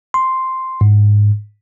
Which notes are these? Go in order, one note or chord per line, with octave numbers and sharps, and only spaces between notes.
C6
G#2